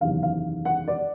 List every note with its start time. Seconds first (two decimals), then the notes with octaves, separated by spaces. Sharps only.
0.01 F#1 E2 C3 D#3 F5
0.23 F5
0.65 F#5
0.88 D5